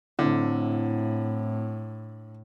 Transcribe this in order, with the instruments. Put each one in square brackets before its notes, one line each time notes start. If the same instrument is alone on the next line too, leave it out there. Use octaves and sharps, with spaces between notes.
[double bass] A2 [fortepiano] D3 [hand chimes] C4 E4